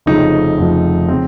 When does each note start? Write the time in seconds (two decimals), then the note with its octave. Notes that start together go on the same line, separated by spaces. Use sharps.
0.06 F1 F2 C#3 F3 D#4
0.58 F1 F2 C#3 F3
1.08 C#3 F3 C4